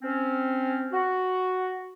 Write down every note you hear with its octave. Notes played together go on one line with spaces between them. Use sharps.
C4 C#4
F#4